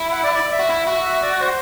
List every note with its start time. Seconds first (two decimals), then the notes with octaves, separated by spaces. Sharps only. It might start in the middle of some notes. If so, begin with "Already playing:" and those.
Already playing: E4
0.12 F#5
0.23 D5
0.35 D5
0.52 E5
0.59 F#4
0.70 E4
0.87 F#4
1.05 E5
1.23 D5
1.40 C5